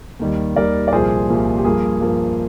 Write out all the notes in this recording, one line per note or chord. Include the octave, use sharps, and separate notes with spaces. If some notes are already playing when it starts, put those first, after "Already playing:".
D#2 D#3 G3
D#2 D#3 G3 A#4 D5
D5
C2 A#2 F3 A#3 G#4 C5
C2 A#2 F3 A#3
G4
G2 F3 A#3 G#4
G2 F3 A#3